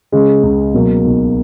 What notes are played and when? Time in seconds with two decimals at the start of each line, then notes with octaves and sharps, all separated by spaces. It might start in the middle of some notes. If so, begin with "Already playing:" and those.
0.12 C#3 G#3
0.43 C#2
0.74 B2 F#3 A#3
1.05 B1